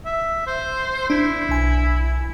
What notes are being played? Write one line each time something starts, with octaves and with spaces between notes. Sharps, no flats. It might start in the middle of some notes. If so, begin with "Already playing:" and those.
E5
C5
D4 E4
B1 G#5